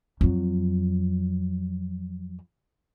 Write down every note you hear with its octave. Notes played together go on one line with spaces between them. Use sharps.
F2 F#3